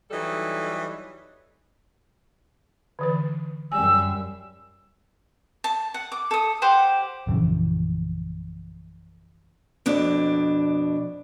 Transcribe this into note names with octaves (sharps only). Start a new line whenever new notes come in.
E3 F#3 G3 D#4 A4
D3 E3 B4
F#2 G3 G#5 E6
A5
F#5
D6
A4 D#6
G4 C5 F#5
A#1 F#2 C#3 E3
F2 B2 D4